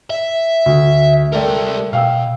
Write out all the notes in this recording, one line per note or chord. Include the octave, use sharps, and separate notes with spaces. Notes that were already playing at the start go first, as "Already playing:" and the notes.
E5
D2
C2 A3 A#4 D5 G5
B2 F5 G5 E6